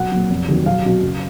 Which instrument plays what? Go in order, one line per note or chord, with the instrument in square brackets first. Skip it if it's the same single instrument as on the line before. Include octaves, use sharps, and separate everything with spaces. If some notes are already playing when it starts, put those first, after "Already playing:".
Already playing: [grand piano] B1 F#5
A#2 F#3
F1
D#2 D#3 F#3
B1 F5
B2 F#3
F#1